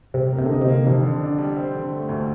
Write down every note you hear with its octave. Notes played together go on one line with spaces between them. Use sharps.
C3 G3
A#3
C3
D3
C3 D#4
C3
A#3
F2 C3 D#3
D3
D4
G3
C4
D3
A3
D2